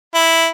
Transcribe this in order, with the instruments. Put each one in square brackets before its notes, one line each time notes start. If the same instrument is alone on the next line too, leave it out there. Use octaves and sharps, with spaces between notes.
[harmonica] E4